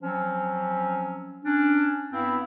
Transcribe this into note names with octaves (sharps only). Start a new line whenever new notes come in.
F3 F#3 C4 C#4
C#4 D4
G2 B3 C4 E4